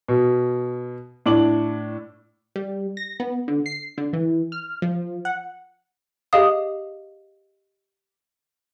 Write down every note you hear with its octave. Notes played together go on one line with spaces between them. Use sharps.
B2
A2 D4 D6 F#7
G3
A#6
B3
D3
C7
D3
E3
F6
F3
F#5
G4 G#4 D#5 F5 D#6